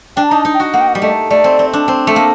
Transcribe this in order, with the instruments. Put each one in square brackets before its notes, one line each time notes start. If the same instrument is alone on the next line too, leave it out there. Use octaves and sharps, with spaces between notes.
[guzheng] D4 [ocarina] G5
[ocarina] A#5
[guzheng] D#4 [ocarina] A5
[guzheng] D#4
[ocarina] G5
[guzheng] F#4
[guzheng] A#3 [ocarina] F#5
[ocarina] G5
F#5
[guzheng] G3
[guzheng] A3 [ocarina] D#5
[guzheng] A3 [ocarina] D5
[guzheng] C4
C4
D4
C4
A3
A#3